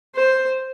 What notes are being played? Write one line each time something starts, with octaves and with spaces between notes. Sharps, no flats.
C5